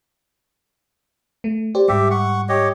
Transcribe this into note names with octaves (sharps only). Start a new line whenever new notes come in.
A3
G4 C5 D5
G#2 G3 G4 E5
F#5 C#6
G4 C#5 D#5